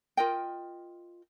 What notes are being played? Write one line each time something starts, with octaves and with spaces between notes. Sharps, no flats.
F4 A#4 D#5 G5